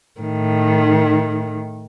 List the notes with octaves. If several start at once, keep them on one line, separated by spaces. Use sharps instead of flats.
A2 D#3